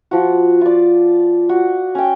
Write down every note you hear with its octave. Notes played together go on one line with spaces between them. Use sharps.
F3 F#4
F4 D5
F#4
C#4 G5